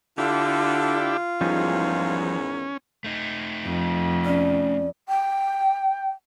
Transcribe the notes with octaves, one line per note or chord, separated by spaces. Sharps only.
D3 D4 E4 F4 G4
E2 G#2 D#3 F3 G3 C#4 D#4
A3 D#4
F2
C#4 D5
G5